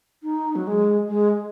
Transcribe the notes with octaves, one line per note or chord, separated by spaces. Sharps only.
D#4
F#3
G#3
G#3